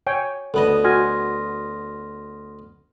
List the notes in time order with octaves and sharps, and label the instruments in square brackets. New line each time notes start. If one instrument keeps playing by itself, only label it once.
[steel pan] C#5 G5 G#5
[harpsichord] D2 B3 D#5 [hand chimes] A4
[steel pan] F#4 G#5 [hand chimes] C6 F6 A#6